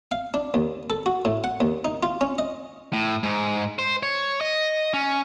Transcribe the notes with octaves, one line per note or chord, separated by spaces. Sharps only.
F5
D4
D#2
A4
F#4
A2
F#5
D#2
D#4
F4
C#4
D#5
A2
G#2
C5
C#5
D#5
C#4